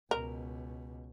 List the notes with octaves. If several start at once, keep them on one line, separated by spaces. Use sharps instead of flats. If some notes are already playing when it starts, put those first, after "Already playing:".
C#2 B2 A#4